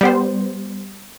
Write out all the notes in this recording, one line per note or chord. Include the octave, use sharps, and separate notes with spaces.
G3 B3 C5